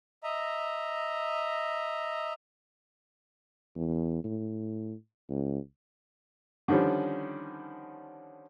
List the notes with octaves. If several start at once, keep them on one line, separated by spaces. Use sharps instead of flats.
D#5 E5 A#5
E2
A2
C#2
D3 D#3 F3 G3 C#4